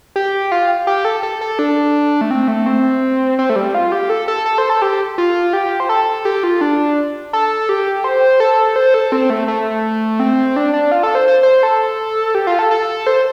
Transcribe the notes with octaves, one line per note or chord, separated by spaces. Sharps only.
G4
F4
G4
A4
A4
A4
D4
A3
C4
A3
C4
C4
A3
G3
F4
G4
A4
A4
A4
C5
A4
G4
F4
G4
C5
A4
G4
F4
D4
A4
G4
C5
A4
C5
A4
C4
A3
A3
C4
D4
D4
F4
A4
C5
C5
C5
A4
G4
F4
A4
A4
C5